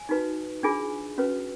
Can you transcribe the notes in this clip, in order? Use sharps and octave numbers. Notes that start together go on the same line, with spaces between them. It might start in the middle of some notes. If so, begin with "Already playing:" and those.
Already playing: G#5
D#4 F#4 B4
D4 F4 G#4 G#5
C#4 F#4 B4